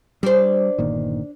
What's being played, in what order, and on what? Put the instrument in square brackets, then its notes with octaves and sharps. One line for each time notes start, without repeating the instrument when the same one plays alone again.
[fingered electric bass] G3 [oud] D4 C5
[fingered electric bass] G1 A#2 D#3